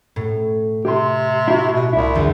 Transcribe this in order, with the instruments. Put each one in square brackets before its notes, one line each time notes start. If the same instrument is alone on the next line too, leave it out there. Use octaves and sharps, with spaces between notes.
[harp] A2
[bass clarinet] C3 [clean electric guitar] G4 C6
[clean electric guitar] E4 F#4
[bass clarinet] B2
[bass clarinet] C2 [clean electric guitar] E4
[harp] E2 D3